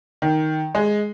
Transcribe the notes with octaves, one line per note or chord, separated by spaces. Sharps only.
D#3
G#3